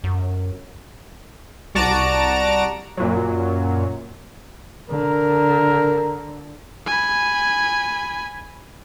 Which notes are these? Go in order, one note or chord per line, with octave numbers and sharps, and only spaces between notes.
F#2
C2 F#4 D5 A5 A#5 D7
F#2 A#2 F#3
D3 A#4
G#5 B5